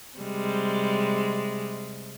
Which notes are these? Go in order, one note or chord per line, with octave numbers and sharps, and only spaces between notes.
C3 G3 G#3